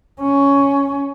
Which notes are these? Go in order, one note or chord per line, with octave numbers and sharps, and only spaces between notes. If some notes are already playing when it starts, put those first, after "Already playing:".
C#4